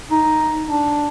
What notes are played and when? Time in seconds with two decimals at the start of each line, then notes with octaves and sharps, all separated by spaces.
0.11 D#4
0.68 D4